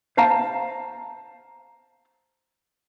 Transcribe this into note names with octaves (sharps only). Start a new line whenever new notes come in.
C5 F5 A5 A#5